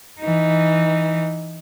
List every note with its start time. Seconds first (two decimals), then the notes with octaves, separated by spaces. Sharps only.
0.21 E3 D#4